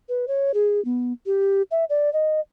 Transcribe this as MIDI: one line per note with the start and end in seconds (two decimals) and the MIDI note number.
0.09 0.25 71
0.28 0.52 73
0.54 0.83 68
0.85 1.13 59
1.26 1.62 67
1.71 1.85 76
1.90 2.12 74
2.13 2.40 75